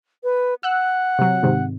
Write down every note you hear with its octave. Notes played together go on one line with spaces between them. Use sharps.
B4
F#5 E6 F#6
C3 F#3
G#2 C3 D#3